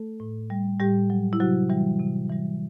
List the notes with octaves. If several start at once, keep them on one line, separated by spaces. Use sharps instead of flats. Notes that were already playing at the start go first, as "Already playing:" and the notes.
Already playing: A3 A4
A2
G3
A2 G3 G4
F#3
E4
C3 F#3 F#4
E3 G3
C3
E3 G3